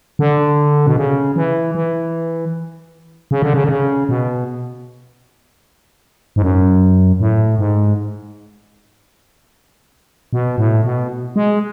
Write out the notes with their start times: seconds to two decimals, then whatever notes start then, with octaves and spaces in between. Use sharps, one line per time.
0.19 D3
0.86 B2
0.96 C#3
1.36 E3
1.75 E3
3.31 C#3
3.42 D3
3.54 C#3
3.64 D3
3.69 C#3
4.09 B2
6.36 G#2
6.42 F#2
7.20 A2
7.59 G#2
10.33 B2
10.58 A2
10.84 B2
11.36 G#3